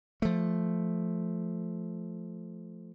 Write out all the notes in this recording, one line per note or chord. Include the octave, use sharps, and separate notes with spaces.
F3 A3